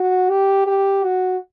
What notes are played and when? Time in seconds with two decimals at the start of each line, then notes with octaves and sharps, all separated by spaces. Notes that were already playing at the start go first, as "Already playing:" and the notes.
Already playing: F#4
0.30 G4
0.67 G4
1.04 F#4